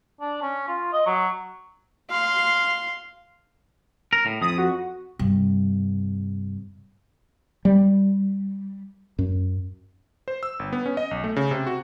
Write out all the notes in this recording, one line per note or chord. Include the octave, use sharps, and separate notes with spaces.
D4
C#4
F4
D#5
F#3
F5 C6
A#4
A2
F2 D#6
F#4
G2 C3
G3
F#2
C5
E6
G1
B3
C#4
D#5
B1
A3
C#3
C3
F#4